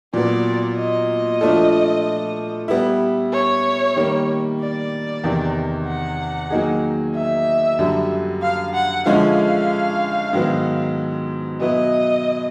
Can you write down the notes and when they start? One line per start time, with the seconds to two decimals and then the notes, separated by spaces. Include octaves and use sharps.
0.14 A#2 F#3 B3 D5
0.77 D#5
1.41 F3 A3 D4 F4 A4
2.68 G3 B3 E4
3.32 C#5
3.96 D#3 G3 A#3
4.59 D5
5.24 E2 C3 D#3
5.87 F#5
6.50 D#3 F#3 A#3 D#4 G#4
7.15 E5
7.79 F#2 D3 G3
8.42 F5
8.74 F#5
9.06 D3 F3 G#3 C#4 E4 F5
10.33 G#2 D#3 F#3 B3
11.61 B2 F#3 B3 E4 D#5